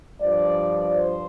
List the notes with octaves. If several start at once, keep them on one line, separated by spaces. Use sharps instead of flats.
G2 F3 D5
C5